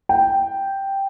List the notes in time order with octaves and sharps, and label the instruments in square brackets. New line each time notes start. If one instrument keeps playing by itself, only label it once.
[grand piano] G5